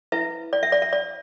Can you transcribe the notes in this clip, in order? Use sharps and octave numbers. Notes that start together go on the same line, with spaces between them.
E4 B4 E5
D5
E5
D5
E5
D5